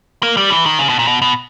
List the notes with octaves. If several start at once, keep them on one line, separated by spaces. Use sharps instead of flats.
A#3
G3
E3
D#3
C#3
B2
A#2
B2
B2